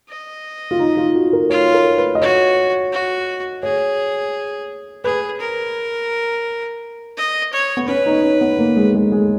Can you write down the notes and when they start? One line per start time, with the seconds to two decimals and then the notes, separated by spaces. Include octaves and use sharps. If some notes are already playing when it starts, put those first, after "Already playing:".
0.09 D#5
0.71 F4
0.79 D#4
0.97 F4
1.15 F#4
1.33 A#4
1.50 F4 C#5
1.74 A#4
1.97 B4
2.15 D#5
2.21 F#4 C#5
2.92 F#4
3.63 G#4 C#5
5.04 G#4 B4
5.40 A#4
7.17 D#5
7.53 C#5
7.77 B3
7.88 C#4 B4
8.06 D#4
8.23 C#4
8.41 B3
8.59 A#3
8.77 G#3
8.94 G#3
9.12 G#3